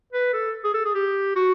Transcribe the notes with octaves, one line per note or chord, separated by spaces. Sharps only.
B4
A4
G#4
A4
G#4
G4
F#4